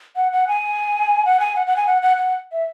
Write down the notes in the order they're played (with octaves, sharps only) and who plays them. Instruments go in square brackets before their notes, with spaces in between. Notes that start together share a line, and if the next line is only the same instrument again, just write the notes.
[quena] F#5
F#5
G#5
F#5
G#5
F#5
F#5
G#5
F#5
F#5
F#5
E5